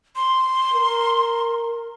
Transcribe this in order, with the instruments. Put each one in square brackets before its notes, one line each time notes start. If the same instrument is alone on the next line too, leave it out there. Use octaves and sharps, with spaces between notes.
[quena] C6
[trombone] A#4